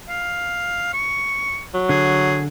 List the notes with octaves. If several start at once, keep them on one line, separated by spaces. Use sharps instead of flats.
F5
C#6
F#3
D3 G#4